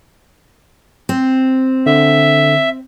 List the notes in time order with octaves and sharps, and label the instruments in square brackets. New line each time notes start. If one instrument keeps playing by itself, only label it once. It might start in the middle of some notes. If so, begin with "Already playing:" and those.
[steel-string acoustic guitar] C4
[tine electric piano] D3 [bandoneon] E5